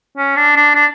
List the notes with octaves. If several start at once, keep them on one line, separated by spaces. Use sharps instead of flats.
C#4
D4
D4
D4